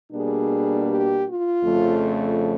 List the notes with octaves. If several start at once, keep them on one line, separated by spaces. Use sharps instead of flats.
B2 G3 A#3 D4 G#4
G4
F4
F2 C#3 F3 A3